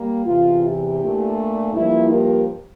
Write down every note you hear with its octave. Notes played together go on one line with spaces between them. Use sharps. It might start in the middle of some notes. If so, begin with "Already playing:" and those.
Already playing: G3 A#3
E2 C3 E3 F4
E4 G4
A#2 A3 D4
G2 F3 A#3 E4
G4 A#4